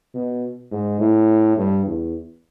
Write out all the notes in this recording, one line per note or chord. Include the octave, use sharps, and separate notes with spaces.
B2
G#2
A2
G2
E2